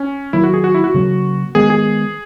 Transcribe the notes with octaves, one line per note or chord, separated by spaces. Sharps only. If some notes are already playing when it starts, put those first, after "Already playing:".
Already playing: C#4
D#3 F#3 A#3 E4
F#4
G#4
F#4
E4
F#4
C#3 F#3 A#3
D#3 G#3 B3 G#4
G#4